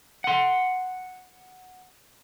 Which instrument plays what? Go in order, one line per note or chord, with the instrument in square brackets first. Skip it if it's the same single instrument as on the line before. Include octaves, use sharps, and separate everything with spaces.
[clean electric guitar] F#5 C6